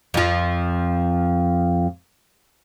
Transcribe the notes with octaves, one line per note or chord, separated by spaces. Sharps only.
F2 F3